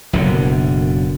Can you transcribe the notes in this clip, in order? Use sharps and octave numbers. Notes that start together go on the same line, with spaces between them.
F#1 F#2 B2 D3